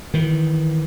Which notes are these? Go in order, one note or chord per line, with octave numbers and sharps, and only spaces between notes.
D#3 E3